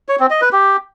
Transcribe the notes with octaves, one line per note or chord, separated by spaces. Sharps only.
C#5
C4
D#5
B4
G4